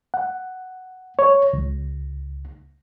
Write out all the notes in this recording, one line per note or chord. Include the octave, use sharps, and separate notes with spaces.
F#5
C#5
C#2